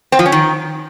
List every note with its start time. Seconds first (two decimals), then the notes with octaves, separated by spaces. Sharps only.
0.12 C4
0.19 F3
0.26 C#4
0.32 D#3